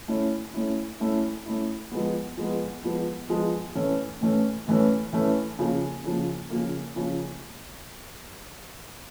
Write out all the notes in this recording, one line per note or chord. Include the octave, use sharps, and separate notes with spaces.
A3 C#4 E4
A3 C#4 E4
A3 C#4 E4
A3 C#4 E4
F3 G#3 B3
F3 G#3 B3
F3 G#3 B3
F3 G#3 B3
A2 E3 A3 C#4
A2 E3 A3 C#4
A2 E3 A3 C#4
A2 E3 A3 C#4
C#3 F3 A#3
C#3 F3 A#3
C#3 F3 A#3
C#3 F3 A#3